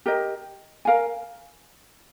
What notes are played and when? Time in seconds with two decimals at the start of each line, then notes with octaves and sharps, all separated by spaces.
0.06 G4 A#4 D#5
0.85 A#4 F5 G#5